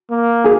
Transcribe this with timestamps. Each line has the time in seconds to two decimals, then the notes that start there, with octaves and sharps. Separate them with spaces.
0.10 A#3
0.44 G#4